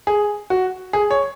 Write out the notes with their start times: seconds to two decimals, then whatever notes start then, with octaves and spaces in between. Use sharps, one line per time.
0.07 G#4
0.50 F#4
0.93 G#4
1.11 C#5